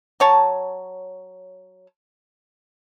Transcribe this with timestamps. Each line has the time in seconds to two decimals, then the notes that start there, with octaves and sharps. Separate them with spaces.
0.20 F#3 C#5 A5